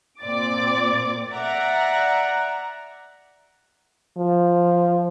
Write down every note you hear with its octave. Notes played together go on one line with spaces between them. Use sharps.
A#2 C4 D5 D6 A6
D5 E5 F#5 A#5
F3